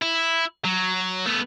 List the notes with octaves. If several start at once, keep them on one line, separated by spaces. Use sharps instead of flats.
E4
F#3
A3 B3